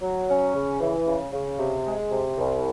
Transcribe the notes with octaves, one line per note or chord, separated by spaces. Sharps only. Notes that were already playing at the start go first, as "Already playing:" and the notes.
F#3
C#4
C#3
E3
C#3
C#3
C3
G#3
C3
C2